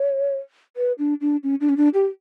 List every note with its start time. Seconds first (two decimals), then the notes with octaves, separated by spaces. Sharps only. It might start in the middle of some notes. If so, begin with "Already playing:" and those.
Already playing: C#5
0.77 B4
0.99 D4
1.21 D4
1.43 C#4
1.61 D4
1.69 C#4
1.77 D4
1.94 G4